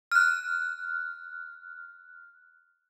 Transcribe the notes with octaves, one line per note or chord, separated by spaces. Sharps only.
F6 F#6